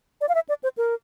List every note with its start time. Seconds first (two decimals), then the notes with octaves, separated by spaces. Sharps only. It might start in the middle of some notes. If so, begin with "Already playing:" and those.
0.21 D5
0.29 F5
0.35 E5
0.49 D5
0.63 C5
0.77 A#4